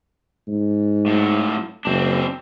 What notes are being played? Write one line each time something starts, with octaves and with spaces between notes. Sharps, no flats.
G#2
A2 F#3
F#1 C4 D4